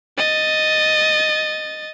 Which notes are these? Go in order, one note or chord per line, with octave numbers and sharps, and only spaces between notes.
D#5 A6